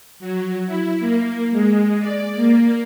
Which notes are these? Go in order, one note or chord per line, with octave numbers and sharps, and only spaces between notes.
F#3
E4
A#3
G#3
D5
A#3